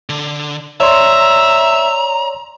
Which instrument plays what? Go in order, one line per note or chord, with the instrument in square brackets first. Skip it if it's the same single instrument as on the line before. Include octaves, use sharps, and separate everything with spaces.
[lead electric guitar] D3
[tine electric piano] C#5 D5 C6 [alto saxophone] E5 [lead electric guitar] A#5